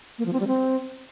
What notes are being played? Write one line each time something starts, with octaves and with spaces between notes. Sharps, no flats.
A#3
F3
C4
G3
C4